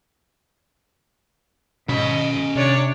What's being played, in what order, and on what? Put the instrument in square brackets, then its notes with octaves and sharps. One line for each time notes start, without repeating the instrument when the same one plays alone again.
[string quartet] G#2 D#5 [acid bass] B2 [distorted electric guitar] C#4 B5
[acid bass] C3 [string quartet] D4 C#5 D5